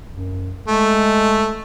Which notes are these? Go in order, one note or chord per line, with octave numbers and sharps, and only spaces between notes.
F#2
G#3 A3